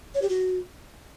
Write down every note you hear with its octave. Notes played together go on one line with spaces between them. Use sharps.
C#5
G4
F#4